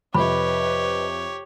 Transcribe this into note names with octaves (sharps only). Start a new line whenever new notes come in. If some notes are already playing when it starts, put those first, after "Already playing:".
F2 C3 G4 B4 C#5 D#5 B5